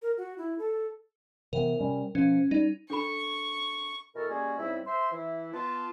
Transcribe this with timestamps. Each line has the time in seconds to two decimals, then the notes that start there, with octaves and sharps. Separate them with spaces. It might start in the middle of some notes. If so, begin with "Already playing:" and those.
0.02 A#4
0.17 F#4
0.38 E4
0.59 A4
1.53 C3 E3 B3 A#4
1.79 C3 G3 C#4
2.15 B2 F3 C#4
2.51 G3 D#4
2.90 D4 A4 B5 C#6
4.16 B2 E3 F#4 A4 A#4
4.30 G3 G#3 A#3 C#4 F#4 G#4
4.59 G#2 C#3 G3 C4 E4
4.86 C5 E5 C6
5.11 E3 E4
5.54 B3 F4 A5